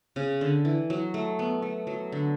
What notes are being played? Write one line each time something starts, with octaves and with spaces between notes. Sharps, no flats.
C#3
D3
E3
F#3
A3
B3
A3
F#3
D3